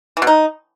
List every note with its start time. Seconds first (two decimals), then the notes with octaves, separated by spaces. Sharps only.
0.17 E3
0.22 B2
0.27 D#4